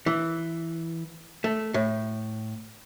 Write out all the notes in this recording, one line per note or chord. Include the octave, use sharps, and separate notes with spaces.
E3
A3
A2